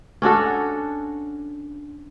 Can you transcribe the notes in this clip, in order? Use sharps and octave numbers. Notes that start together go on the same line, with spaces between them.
C#4 D4 F#4 A4